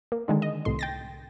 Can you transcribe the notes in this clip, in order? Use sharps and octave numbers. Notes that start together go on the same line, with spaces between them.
A#3
D3 D#3 G#3
D#5
C2 A2 C6
G5 A6 A#6